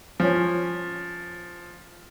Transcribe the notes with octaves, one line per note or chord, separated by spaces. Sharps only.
F3 C#4